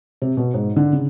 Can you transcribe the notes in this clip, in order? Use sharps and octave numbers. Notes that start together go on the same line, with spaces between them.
C3
B2
G#2
D3
C#3